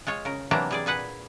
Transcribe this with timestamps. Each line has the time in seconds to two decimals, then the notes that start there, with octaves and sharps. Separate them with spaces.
0.07 G#3 F4 C#5
0.25 C#3 A#4
0.51 C3 E3 F#3 A#3 D4 A#5
0.71 G3 G#4 D5
0.86 A#2 G#4 B4 F#5